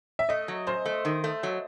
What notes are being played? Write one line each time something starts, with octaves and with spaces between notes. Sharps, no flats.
E5
A3 D#5
F#3
F#2 C5
A3
D#3
A3
F#3